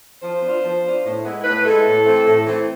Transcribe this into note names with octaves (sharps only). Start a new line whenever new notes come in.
F3 C5
B3 D4 F4
F3
B3 D4 F4
A2
G#3 B3 E4
A2 B4
G#3 B3 E4 A4
A2
E3 A3 C4
A2
E3 A3 C4